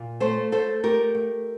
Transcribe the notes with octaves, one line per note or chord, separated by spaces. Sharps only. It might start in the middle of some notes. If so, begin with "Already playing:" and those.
Already playing: A#2
A3 A4 C5
A3 A4 C5
A3 G4 A#4
A3